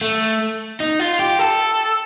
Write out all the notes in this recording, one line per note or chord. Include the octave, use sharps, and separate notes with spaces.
A3
D#4
F4
G4
A4